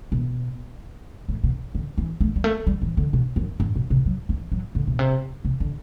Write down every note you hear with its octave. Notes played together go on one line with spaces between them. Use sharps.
B2
A2
B2
D3
E3
A3
G3
A3
G3
E3
D3
B2
F#2
G2
B2
C3
F#3
E3
F#3
D3
B2
C3
C3
D3